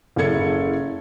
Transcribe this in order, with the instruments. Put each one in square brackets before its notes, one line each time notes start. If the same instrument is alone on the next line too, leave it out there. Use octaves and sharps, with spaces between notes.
[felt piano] F#1 C#3 E4 A4 G#6 C#7